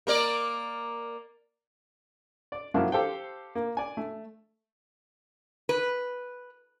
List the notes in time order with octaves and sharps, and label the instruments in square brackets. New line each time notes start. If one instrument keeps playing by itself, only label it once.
[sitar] A#3 A#4 D5
[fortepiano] D5
F#2 F3 A#3 D4 E4 F4
G4 A4 C5 F5 G5
A#3
D5 G#5
A3
[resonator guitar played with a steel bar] B4